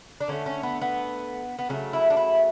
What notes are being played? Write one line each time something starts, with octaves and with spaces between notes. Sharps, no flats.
D4
D3 A3 C#4
C#4
B3
B3
B3
C#3 F#3 A3 C#4
E4
D4
E4